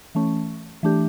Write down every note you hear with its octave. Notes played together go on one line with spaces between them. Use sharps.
E3 A3 C#4
E3 A3 D4 G4